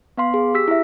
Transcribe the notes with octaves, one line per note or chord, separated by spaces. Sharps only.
B3 F5 C6
G#4
G4 E6 B6
E4 E5